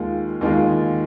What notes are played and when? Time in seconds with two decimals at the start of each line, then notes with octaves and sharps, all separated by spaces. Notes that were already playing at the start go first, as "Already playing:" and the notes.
Already playing: D#2 D#3 G#3 F4
0.41 D#2 D#3 G#3 F4